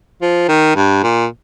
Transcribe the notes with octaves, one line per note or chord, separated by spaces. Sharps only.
F3
D#3
G2
A#2